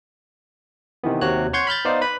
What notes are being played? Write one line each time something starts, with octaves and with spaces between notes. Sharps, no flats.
C3 D#3 E3 B3
D#2 C3 F#4 C#5 F#6
C#5 F#5 C6 C#6 G6 G#6
B5 F6 G6 A6
B3 D#4 C5 D5 F5
B4 B5